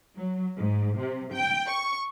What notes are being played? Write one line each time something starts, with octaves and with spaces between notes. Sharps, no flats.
F#3
G#2
C3
G5
C#6